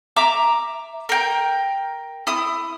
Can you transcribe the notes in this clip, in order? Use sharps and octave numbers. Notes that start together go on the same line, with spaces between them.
E5 A#5 D6
A#4 G5
E4 D#6